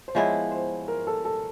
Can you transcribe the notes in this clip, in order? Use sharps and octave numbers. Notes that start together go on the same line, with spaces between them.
C5
F3 G#3 B3 E4 C#5
C5
A#4
A4
A4